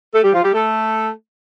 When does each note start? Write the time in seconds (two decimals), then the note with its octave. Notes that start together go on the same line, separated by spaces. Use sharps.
0.13 A3 A4
0.23 G3 G4
0.33 F3 F4
0.43 G3 G4
0.53 A3 A4